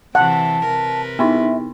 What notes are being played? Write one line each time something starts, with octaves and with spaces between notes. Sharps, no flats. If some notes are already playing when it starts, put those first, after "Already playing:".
C3 E3 F#5 A5
C3 A#4 B4
B3 D#4 E4 E5